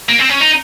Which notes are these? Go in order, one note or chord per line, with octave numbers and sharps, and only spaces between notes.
A#3
C4
C#4
D#4